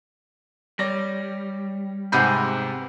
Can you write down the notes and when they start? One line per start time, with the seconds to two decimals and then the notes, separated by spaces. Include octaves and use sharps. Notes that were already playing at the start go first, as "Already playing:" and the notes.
0.79 G3 C#5 D5 A#6
2.12 G#2 C3 B3 G#4 F#5 B5 G6